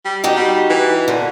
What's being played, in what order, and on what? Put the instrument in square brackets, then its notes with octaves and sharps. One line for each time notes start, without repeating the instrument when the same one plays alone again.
[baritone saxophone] G3
[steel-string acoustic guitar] D#4 F#4 G4
[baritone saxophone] G3
E3
[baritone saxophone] A#2 [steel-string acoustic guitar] D3